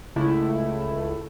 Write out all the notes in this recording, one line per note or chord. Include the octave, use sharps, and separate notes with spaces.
C#2 A3 E4